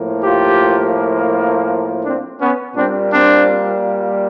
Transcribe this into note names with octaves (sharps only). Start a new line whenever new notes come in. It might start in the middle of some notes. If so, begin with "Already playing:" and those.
Already playing: A2 F3 A#3
F4 G4
C4 D4
B3 C#4
A#2 G3 A#3 C4 D4
C4 D4